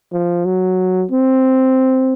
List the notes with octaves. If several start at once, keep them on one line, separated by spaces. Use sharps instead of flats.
F3
F#3
C4